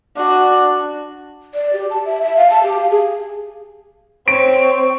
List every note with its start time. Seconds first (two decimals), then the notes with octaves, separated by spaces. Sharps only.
0.17 D4 F#4
1.54 D5
1.73 G4
1.90 A5
2.05 E5
2.22 E5
2.36 F5
2.50 A5
2.63 G4
2.79 F5
2.91 G#4
4.28 C4 C#5 D7